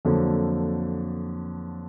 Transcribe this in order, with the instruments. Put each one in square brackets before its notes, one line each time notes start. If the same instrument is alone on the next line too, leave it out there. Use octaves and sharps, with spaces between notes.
[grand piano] F2 D3 F#3 A#3